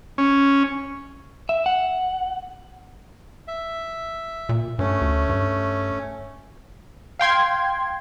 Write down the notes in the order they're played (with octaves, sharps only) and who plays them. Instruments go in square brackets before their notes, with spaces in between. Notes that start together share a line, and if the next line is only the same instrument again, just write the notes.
[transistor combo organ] C#4
[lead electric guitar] E5
F#5
[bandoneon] E5
[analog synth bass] A#2
[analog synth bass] G2 [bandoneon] A3 C#4
[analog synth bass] D2
G2
[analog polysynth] F5 G5 C6 G#6